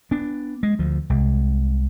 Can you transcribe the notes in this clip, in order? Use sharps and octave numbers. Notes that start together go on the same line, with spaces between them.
B3 D4
G#3
D2 F3
C2 G#3